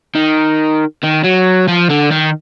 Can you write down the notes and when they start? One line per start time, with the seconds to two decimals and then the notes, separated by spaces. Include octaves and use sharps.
0.15 D#3
1.03 D#3
1.24 F#3
1.68 F3
1.90 D3
2.12 D#3